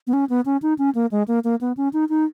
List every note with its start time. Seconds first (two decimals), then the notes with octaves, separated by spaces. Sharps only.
0.07 B3
0.13 C#4
0.30 B3
0.46 C#4
0.62 D#4
0.78 C#4
0.95 A#3
1.12 G#3
1.28 A#3
1.44 A#3
1.61 B3
1.77 C#4
1.93 D#4
2.09 D#4